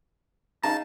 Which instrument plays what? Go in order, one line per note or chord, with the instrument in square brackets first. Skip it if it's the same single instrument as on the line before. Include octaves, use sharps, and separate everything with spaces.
[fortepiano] C#4 D#4 [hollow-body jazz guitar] G#4 F5 A#5 [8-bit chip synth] A5